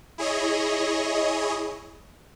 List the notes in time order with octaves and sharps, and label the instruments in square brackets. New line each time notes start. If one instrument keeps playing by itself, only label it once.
[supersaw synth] E4 G#4 C#5 D#5